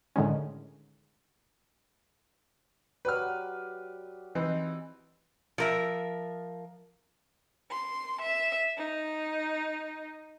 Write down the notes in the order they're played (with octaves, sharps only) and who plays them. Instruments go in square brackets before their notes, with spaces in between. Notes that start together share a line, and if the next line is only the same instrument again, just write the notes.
[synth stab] A2 D3 D#3 G#3 C#4
[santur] F#3 G4 D5 [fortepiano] B4 F6
[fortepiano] E3 C4 D#4
[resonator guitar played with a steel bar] F3 A#4 E5
[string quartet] C6
E5
D#4